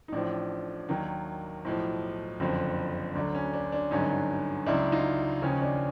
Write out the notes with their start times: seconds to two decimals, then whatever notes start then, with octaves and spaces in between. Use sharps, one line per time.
0.08 D#4
0.12 A1 A2 F3 D4
0.89 D#2 D#3 F#3
1.65 B1 A2 F3
2.40 F#1 F2 D3 F3
3.15 D2 D3 F#3 D4
3.35 C#4
3.53 D4
3.72 D4
3.91 G#1 G2 D3 F#3 C#4 D#4
4.66 C#2 C#3 F#3 D4 E4
4.92 D#4 F4
5.42 D#2 C#3 F3 C#4 D#4
5.62 D4